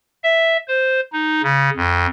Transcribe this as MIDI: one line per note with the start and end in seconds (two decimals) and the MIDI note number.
0.23 0.57 76
0.68 1.00 72
1.12 1.42 63
1.43 1.70 49
1.76 2.06 41